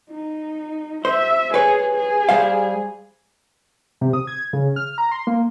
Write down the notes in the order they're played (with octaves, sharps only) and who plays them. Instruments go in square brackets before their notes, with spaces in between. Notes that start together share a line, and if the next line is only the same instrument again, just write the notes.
[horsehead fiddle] D#4
[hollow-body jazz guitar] C5 [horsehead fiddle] E5
[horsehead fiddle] G#4 [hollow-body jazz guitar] B4 C#5
[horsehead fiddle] G#4
[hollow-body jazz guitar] G3 C5 F5
[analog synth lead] C3
D#6
G#6
C#3
F6
A#5
C6
A#3